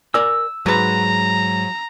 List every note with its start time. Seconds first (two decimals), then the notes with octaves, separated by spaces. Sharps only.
0.14 A#4 D5 G#5 E6
0.66 G#2 F#3 B4 A#5